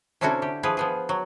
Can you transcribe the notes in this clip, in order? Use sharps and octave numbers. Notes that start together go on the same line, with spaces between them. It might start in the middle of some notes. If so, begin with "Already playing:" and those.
C3 C#4 D4 E4 F#4 A4
D3 G4
E3 F3 G#4 B4
F3 B3 G#4
F#3